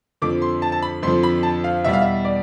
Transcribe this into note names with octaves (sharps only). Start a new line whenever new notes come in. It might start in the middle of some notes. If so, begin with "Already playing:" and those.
F2 D3 F3 D6
C6
A5
A5
B5
F2 D3 F3 C6
B5
A5
F5
E2 B2 G3 E5
F5
E5
D5